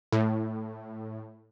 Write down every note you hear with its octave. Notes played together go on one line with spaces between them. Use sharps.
A2